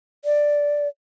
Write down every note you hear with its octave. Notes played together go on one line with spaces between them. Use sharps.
D5